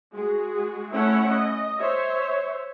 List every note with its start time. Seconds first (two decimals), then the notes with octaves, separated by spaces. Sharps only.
0.13 G#3 F#4 G#4
0.92 A3 C#4 E4 C#5 F#5
1.29 D#5
1.78 C5 C#5 E5